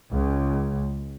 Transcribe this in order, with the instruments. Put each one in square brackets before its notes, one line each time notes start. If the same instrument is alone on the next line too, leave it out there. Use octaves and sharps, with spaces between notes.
[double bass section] C#2